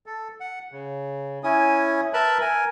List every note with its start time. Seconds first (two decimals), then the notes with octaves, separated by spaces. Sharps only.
0.06 A4
0.40 F#5
0.72 C#3
1.44 C#4 E4 G#5 D#6
2.13 A#4 B4 E5 A5 B5
2.41 A#4 G#5